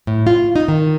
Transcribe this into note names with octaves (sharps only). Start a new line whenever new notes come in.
A2
F4
D#4
D#3